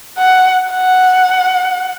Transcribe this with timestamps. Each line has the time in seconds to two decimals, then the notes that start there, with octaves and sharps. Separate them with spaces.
0.18 F#5
0.71 F#5